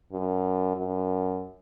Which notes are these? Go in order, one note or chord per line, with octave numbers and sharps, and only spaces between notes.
F#2
F#2